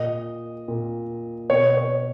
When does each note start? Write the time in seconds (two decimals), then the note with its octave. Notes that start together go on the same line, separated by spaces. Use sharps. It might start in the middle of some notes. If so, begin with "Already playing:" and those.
Already playing: A#2 D#5
0.68 A#2
1.50 B2 C#5
1.77 C#5